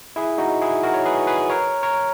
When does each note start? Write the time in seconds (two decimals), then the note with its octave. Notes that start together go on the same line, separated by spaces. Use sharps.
0.16 E4 G#4
0.38 D#4 F#4
0.62 E4 G#4
0.83 F#4 A#4
0.94 C#5
1.06 G#4 B4
1.27 G#4 B4
1.50 A#4 C#5
1.83 A#4 C#5